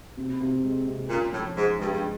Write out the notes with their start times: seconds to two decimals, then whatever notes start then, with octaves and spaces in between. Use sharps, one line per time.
0.17 C3
0.40 C3
0.63 G#3
0.87 C3
1.09 A#2 C#4
1.33 A2 F3
1.56 G#2 G#3
1.80 G2 G#3
1.92 G2